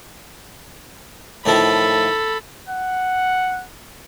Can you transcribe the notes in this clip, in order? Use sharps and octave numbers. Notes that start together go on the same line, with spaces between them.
A2 D#3 F3 A4 B5
F#5